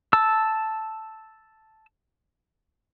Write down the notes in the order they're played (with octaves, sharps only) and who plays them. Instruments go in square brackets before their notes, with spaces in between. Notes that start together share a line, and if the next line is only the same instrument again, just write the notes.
[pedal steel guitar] A5 E6